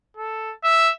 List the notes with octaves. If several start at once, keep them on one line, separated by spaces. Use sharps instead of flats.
A4
E5